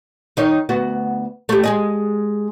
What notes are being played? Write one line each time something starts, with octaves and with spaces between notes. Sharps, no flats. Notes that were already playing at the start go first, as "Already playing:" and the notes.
D#3 D#4 C#5
D2 B3 F#4
A3 G4
G#3 G#4 D#5